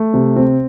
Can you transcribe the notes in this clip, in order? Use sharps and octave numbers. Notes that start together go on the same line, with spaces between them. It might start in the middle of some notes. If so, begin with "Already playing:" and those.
Already playing: A3
C3
C4